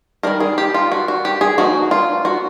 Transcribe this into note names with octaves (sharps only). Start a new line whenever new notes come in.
D#3 G3 A#3 A#4
G#4
G4
F4
F#4
F#4
G4
G#4
F3 A#3 D#4 F#4
F4
F#4